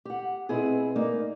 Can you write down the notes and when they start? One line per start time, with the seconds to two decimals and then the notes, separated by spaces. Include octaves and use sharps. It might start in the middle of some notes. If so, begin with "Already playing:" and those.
0.05 G4 F#5
0.49 B2 B3 C4 E4 G#4
0.96 A#3 D#4 D5